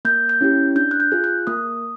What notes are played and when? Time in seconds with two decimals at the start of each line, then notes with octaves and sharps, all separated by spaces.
0.05 A#3 G6
0.29 G6
0.41 C#4 E4 G4
0.76 D4 G6
0.91 F#6
1.00 G6
1.12 F4 G#4
1.24 F#6
1.47 A#3 D#6